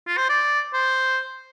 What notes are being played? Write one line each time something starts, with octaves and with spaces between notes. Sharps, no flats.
F4
C5
D5
C5